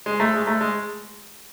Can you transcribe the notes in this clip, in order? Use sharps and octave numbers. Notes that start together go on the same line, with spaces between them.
G#3
A3
G#3
A3
G#3